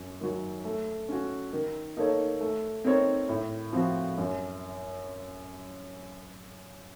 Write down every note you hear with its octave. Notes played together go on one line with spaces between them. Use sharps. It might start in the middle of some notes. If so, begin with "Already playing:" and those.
Already playing: F#2
D#3 F#3
A3
C#4 F#4
D#3
A#3 D#4 A4 C#5
A3
C4 D#4 A#4 C#5
A2
F3 C4 F#4
F#2